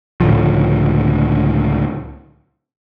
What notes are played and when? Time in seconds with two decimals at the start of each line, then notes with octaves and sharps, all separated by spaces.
0.20 C#2 A2 D3 F3